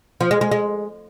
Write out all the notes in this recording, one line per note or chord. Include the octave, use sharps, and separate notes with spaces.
F3
G#3
G#3
G#3